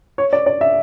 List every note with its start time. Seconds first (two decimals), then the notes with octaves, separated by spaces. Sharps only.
0.18 C#5
0.33 D5
0.46 D5
0.61 E5